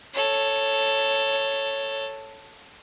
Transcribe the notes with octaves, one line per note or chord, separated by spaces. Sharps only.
A4 C#5